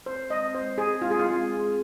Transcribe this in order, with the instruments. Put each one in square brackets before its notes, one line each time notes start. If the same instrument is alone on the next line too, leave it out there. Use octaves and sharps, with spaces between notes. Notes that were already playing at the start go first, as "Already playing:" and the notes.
[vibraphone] C4 [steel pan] C5
[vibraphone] G#3 [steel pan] D#5
[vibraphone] G#3 [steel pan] C5
[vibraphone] C4 [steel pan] G#4
[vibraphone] G#3 [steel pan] F4
[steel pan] G#4
F4
[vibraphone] G#3
G#4